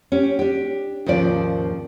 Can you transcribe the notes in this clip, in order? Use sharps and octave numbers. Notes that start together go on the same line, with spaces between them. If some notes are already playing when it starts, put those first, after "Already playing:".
C#4 G4
D4 G4
D#2 G#2 C#3 F3 D5